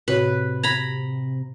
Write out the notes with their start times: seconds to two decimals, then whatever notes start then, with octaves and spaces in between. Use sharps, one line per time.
0.08 A2 C3 F#4 B4 C#5
0.63 A#5 B5 G#6 A#6